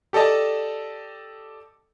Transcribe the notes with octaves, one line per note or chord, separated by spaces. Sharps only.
G4 A4 D5 D#5 A5